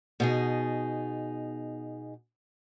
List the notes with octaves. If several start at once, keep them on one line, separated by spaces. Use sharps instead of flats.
B2 D#4 G#4